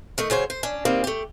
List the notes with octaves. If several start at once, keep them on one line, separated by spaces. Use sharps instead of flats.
D#3 A3 D#5
C#3 F#3 C5 C#5
C5
C#4 D4
D#3 G3 A#3 C4
A3 G4